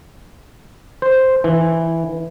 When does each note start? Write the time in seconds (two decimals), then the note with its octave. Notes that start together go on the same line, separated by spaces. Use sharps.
1.02 C5
1.44 E3